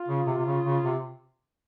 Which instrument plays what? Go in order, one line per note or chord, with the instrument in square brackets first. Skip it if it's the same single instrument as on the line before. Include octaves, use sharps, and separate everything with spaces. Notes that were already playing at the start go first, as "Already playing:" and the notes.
Already playing: [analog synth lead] F4
[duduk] C#3
C3
C3
C#3
C#3
C3